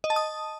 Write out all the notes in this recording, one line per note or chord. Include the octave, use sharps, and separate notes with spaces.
D#5
A5
D#6